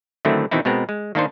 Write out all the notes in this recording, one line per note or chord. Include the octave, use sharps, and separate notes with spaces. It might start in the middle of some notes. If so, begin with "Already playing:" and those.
D3 D#3 F#3 A3 C4 E4
B2 D#3 E3 C4 D#4 E4
B2 G#3 B3 C4 A#4
G#3
D#3 A#3 D4 D#4 C5